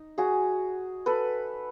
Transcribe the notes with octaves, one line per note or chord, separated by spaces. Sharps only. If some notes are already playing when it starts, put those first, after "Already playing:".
Already playing: D#4
F#4 G#4
A4 B4